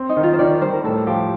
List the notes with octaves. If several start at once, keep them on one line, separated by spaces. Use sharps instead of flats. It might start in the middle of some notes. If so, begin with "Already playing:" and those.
Already playing: C4
D#4
D#3
F4
C5
D#3 D5
G3 C5
A#4
A2 A4
F3 G4